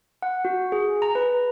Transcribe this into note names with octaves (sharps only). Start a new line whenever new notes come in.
F#5
F#4
G#4
A#5
B4